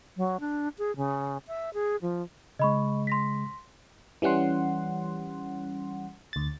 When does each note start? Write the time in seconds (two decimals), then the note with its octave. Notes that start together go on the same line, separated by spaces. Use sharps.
0.17 F#3
0.40 D4
0.78 G#4
0.97 C#3
1.48 E5
1.74 G#4
2.02 F3
2.59 C#3 G#3 D#5 B5 C#6
3.07 C6 A#6 B6
4.22 E3 G3 C#4 F#5 C6
6.33 D2 A6